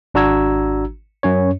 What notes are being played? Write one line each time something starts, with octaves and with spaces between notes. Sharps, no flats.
G#1 D4 F#4 A#5 E6 G#6
F#2 C#4 C#5